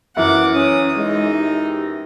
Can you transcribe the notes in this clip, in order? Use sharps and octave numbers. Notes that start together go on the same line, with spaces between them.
F#2 E3 F#5 D6
C#4 D#6
G#3 D#4
G4